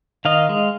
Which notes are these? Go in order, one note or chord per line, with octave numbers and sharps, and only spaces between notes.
D#3 D#5 F5
G#3